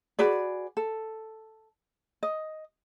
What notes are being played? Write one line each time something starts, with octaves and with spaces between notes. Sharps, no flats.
F#4 G#4 B4 D5
A4
D#5